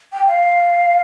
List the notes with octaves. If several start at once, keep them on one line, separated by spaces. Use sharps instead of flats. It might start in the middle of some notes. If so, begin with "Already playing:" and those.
G5
F5